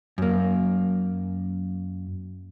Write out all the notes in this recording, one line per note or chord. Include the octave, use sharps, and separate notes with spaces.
F#2 A#3